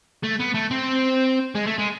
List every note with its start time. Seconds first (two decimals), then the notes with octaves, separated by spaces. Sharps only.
0.23 A3
0.39 B3
0.54 A3
0.71 C4
1.55 G#3
1.66 A3
1.78 G#3